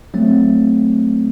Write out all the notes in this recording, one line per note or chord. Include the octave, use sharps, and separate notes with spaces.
F#3 A3 C4